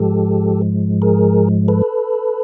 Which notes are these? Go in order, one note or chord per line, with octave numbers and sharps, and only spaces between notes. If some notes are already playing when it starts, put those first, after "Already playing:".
Already playing: G#2 F3 G#3 G4 A4
G#4 A#4
A4 B4